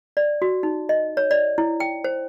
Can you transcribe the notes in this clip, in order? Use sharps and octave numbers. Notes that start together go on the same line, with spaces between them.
D5
F#4
D#4
D#5
C#5
D5
E4
G5
C5